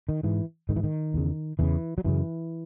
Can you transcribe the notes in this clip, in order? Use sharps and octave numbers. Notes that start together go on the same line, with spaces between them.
D#3
G#2 E3
G#2 D#3
E3
D#3
E2 C#3
E2 C#3 E3
F#3
F#2 C#3 E3